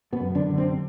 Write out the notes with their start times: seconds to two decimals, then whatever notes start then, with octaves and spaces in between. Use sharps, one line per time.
0.13 B2 B3
0.20 F#2
0.35 D3 D4
0.50 D3
0.58 C3 C4